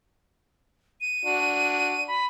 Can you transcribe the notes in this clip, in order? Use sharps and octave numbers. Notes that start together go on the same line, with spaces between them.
D#7
D4 F#4
B5